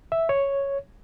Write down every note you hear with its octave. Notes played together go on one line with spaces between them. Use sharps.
E5
C#5